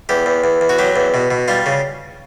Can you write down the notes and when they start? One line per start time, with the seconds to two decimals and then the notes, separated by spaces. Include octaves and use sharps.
0.09 E2 G4
0.26 E2
0.44 E2
0.61 E2
0.69 F#4
0.79 F#3 G4
0.96 E2
1.14 B2
1.31 B2
1.48 G3 F4
1.66 C#3